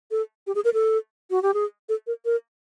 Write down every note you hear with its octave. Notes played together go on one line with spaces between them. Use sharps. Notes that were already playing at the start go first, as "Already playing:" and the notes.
A4
G4
G#4
A#4
A4
F#4
G4
G#4
A4
A#4
A#4